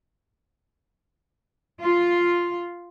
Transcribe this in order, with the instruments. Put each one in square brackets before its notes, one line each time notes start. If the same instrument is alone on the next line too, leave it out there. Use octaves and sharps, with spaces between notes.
[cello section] F4